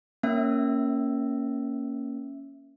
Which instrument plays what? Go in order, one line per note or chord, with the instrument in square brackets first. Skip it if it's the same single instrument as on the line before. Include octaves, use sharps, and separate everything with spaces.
[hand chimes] A#3 C#4 E5